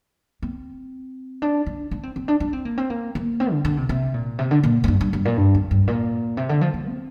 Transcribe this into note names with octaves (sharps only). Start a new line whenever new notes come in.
C4
D4
D4
D4
C4
C4
D4
D4
C4
A#3
C4
A#3
A#3
C4
D3
D3
C3
C3
A#2
C3
D3
A#2
A#2
G2
G2
G2
A#2
G2
F2
G2
A#2
C3
D3
F3
F3
C4